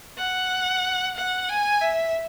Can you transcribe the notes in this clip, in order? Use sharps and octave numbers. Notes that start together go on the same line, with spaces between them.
F#5
F#5
G#5
E5